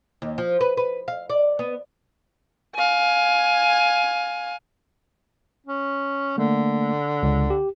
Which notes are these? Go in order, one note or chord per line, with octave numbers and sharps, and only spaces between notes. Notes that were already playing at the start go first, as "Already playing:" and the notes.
D#2
F3
B4
B4
F5
D5
B3
F5 G#5
C#4
D3 A3 A#3
C#2
G4